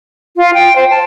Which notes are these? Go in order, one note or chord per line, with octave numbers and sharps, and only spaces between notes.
F4
G5
C5
A5